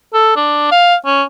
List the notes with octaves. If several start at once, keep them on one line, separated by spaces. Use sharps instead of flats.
A4
D4
F5
C#4